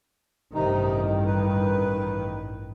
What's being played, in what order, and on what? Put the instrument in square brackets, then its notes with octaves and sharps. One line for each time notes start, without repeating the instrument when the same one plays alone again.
[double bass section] A1 G2 D#3 [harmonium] C3 D#4
[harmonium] B4